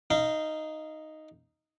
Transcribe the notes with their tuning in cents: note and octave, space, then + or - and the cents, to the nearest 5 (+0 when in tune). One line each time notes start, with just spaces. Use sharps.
D#4 +0 F5 -25